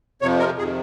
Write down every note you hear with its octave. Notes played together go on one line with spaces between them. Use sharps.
F2 C3 F3 C#5
A#4
F2 C3 D#3 G#4